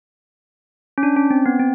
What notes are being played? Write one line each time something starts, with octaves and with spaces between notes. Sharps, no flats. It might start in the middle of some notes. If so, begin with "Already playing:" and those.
C#4
D4
C#4
C4
B3
C4